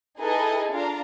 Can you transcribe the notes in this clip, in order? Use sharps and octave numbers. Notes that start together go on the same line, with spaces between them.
D#4 E4 G#4 A4 B4 D#5
D4 F4 F5 A#5